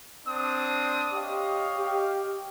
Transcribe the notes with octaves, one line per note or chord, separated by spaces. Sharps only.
C4 D4 D#6
G4 C#5 D#5 F5
G4